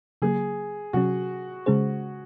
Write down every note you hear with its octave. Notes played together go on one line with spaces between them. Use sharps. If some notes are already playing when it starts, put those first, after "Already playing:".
C#3 F#3 A#3 G#4
C3 F#3 C#4 F#4
C#3 G#3 C#4 G#4 C5